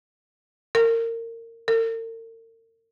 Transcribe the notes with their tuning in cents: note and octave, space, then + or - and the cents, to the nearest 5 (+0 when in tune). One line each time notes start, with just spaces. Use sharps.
A#4 -25
A#4 -45